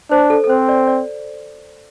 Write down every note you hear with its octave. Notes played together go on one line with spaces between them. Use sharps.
D4 C5
A4
A4
C4 C5
D5
D5